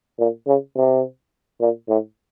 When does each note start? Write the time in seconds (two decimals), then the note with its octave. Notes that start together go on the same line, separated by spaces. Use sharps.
0.19 A#2
0.47 C#3
0.77 C3
1.61 A#2
1.89 A2